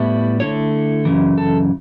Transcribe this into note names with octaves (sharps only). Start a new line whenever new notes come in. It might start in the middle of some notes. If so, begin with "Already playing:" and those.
Already playing: A2 G3 B3 E4
D3 A3 E4 C#5
F#2 C#3 E3
A4